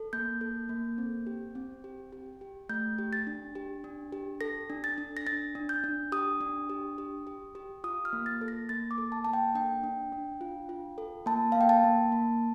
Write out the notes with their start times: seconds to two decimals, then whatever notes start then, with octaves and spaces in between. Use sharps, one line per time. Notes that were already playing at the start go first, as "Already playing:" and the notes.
Already playing: A4
0.13 A#3 G6
0.41 A4
0.69 A#3
0.98 C4
1.27 G4
1.55 C4
1.84 G4
2.13 G4
2.41 G4
2.69 A3 G6
2.99 G4
3.13 A6
3.27 D4
3.55 G4
3.84 D4
4.13 G4
4.41 A4 A#6
4.70 D4
4.84 A6
4.98 D4
5.17 A#6
5.27 D4 A6
5.55 D4
5.69 G6
5.84 D4
6.12 G4 D#6
6.41 D4
6.69 G4
6.98 G4
7.27 G4
7.55 G4
7.84 F4 D#6
8.05 F6
8.13 A#3
8.26 A6
8.41 A4
8.48 A#6
8.69 A#3 A6
8.91 D6
8.98 A4
9.12 A5
9.25 A#3 A5
9.33 G5
9.55 D4 G5
9.84 D4
10.12 D4
10.41 F4
10.69 F4
10.98 A4
11.26 A#3 A5
11.52 A#3 F5
11.61 G5
11.69 A5
11.84 A#3
12.12 A#3